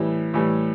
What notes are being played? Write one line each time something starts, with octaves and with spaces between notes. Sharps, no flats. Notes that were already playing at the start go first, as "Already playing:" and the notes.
Already playing: A2 E3 G3
A2 E3 G3